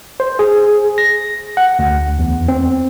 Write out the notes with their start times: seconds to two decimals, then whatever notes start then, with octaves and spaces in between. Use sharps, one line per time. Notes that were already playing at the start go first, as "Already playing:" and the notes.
0.20 C5
0.39 G#4
0.98 A#6
1.57 F#5
1.79 D2
2.19 E2
2.48 C4